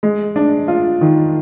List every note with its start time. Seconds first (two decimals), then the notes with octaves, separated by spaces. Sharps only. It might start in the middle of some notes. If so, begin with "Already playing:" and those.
0.03 G#3
0.36 D4
0.68 F4
1.01 D#3